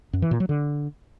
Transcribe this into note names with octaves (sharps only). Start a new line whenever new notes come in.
F#2
E3
A#2
F#3
D3